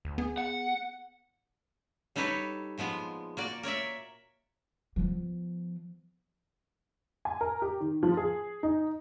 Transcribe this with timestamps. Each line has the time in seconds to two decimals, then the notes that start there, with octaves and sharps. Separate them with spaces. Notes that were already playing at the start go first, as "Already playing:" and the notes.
0.05 D2
0.18 B3 G#4
0.38 F#5
2.16 G3 D#4 A4 B4 C#5
2.78 A#2 F3 G#3 B3
3.37 A#3 F#4 D5
3.63 A#4 C#5 D5 E5
4.96 F3 B3
7.25 G#5
7.41 A#4
7.62 G4
7.80 D#3
8.03 F3
8.17 G#4
8.63 D#4